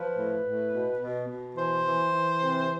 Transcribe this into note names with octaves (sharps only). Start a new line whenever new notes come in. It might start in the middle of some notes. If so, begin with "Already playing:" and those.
Already playing: F3 B4
A2
A2
B2
B2
B2
E3 C5
E3
E3
C3